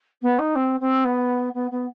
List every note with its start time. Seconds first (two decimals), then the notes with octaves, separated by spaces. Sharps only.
0.22 B3
0.38 D#4
0.55 C4
0.80 C4
1.04 B3
1.54 B3
1.71 B3